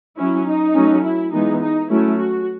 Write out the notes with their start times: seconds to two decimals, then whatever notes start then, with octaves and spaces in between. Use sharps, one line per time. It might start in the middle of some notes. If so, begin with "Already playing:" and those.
0.18 F#3 C#4 E4
0.47 D#4
0.75 F#3 A3 C#4
1.04 E4
1.33 E3 G#3 B3 D#4
1.61 D#4
1.90 F#3 A3 C#4 E4
2.19 F#4